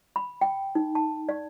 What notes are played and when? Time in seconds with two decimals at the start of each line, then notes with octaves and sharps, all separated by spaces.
0.16 B5
0.41 G5
0.75 D#4
0.95 A5
1.29 D5